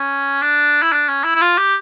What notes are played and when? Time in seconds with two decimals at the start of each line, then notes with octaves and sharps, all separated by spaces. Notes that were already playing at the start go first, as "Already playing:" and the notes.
Already playing: C#4
0.42 D4
0.83 E4
0.92 D4
1.09 C#4
1.24 E4
1.36 E4
1.41 F4
1.58 G4